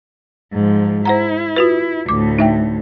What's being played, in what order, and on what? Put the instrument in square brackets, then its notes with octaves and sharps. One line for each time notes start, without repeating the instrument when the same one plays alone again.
[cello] G#2 F3
[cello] E4 [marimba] C5 F#5 A#5
[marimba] F4 F#4 B4
[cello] D2 A2 [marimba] D6
[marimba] D#4 E5 G5